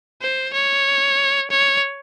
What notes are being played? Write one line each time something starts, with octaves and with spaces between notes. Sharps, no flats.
C5
C#5
C#5